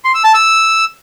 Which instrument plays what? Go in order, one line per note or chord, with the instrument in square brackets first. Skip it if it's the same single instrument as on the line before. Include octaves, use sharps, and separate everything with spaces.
[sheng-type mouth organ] C6
E6
A5
E6